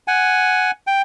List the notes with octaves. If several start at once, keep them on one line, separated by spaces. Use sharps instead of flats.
F#5 G#5
G5